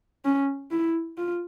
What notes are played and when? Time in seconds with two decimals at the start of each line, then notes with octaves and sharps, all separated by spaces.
0.25 C#4
0.71 E4
1.18 F4